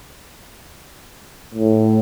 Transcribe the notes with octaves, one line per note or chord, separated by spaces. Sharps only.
A2